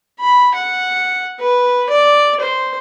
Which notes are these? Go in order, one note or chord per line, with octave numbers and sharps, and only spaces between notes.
B5
F#5
B4
D5
C5